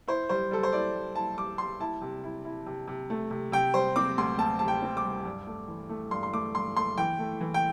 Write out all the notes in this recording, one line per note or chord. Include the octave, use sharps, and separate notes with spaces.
E4 C5
G3 C5
G3 A4
C5
E4 D5
G3
E4 A5
G3 D6
G3 C6
E4 A5
C3
E4
E4
C3
C3
A3
C3
C3 G5
G3 C5
C4 D6
D2 C6
D2 A5
C3 A5
G5
C4
D6
G3
G2
A3
E3
A3
G2 C6
C6
A3 D6
G2 C6
A3 C6
E3 G5
A3
E3
G5